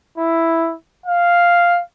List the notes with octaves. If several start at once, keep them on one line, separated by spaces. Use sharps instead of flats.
E4
F5